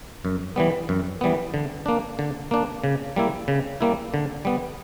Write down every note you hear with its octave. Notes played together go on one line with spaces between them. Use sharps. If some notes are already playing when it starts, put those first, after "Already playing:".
F#2
E3 G3 B3
F#2
E3 G3 B3
D3
A#3 D4
D3
A#3 D4
C#3
G3 A#3 E4
C#3
G3 A#3 E4
D3
G3 B3